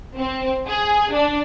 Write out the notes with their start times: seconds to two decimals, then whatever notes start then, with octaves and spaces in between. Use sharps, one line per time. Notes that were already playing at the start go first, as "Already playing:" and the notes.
0.16 C4
0.67 G#4
1.13 D4